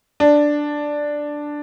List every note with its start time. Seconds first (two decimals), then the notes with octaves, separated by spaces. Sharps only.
0.20 D4